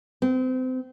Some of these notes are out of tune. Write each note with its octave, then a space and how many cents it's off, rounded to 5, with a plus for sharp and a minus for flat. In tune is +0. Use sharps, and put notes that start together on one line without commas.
C4 -30